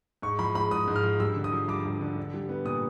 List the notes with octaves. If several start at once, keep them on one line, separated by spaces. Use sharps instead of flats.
G#2 C#6
F3 B5
G#3 B5
G#2 D#6
G#2
F6
F3
G2 E6
D3
D#6
F3
G2 D6
G2
D3
D4
G3
B3
A#2 D#6